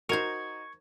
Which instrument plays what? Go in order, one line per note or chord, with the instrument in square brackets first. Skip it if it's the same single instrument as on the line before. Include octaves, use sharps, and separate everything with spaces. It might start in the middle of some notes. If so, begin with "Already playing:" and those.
[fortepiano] D#4 F#4 [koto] A#4 C5 [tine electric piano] C#6 G#6